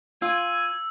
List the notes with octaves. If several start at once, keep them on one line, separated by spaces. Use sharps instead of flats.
F4 G#5 E6